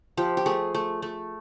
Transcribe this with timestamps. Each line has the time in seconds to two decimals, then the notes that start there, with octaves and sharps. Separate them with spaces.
0.17 F3 G4
0.37 G4
0.46 A3 G#4
0.75 A3
1.02 A3